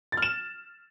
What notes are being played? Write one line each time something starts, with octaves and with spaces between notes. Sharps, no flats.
A6
F6
E7